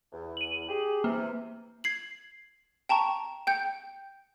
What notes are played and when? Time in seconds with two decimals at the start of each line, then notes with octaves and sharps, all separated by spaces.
0.13 E2
0.37 D#7 F#7
0.69 G4 G#4
1.04 C3 E3 A#3
1.84 G#6 C7 F#7
2.89 G5 A5 A#5 C#6
3.47 G5 G6 C#7